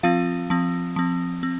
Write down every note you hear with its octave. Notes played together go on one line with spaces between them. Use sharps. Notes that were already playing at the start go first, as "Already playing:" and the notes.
F3 C4 F4 F5
F3 C4
F3 C4
C4